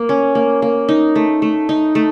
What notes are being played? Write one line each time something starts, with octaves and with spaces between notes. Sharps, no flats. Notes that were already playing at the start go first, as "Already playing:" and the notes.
Already playing: A#3
C#4
A#3
A#3
D#4
A3
A3
D#4
A3